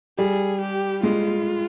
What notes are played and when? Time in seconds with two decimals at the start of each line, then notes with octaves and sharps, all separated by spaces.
0.18 G3 G#4
0.62 G4
1.03 G#3 F4